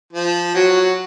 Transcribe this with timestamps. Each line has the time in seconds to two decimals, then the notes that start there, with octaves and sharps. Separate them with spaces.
0.13 F3
0.54 F#3 F#4